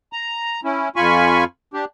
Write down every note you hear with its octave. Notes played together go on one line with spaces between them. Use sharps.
A#5
C#4 E4
F2 F4 G#5 B5 C#6
D4 G4